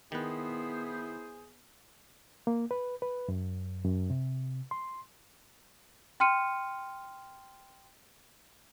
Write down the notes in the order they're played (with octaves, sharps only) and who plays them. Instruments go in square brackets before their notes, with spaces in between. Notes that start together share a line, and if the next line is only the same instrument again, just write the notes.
[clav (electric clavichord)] D#3 B4 [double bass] B3 [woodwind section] E4 C5 [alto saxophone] G#4
[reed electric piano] A#3
B4
B4
F#2
F#2
C3
C6
[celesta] G5 C6 F6 C#7 D#7